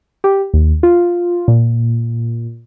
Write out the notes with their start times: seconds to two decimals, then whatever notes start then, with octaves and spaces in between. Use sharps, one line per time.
0.24 G4
0.54 D#2
0.83 F4
1.48 A#2